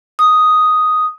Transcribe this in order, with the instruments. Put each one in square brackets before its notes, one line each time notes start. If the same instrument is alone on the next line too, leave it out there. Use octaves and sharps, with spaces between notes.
[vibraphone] D#6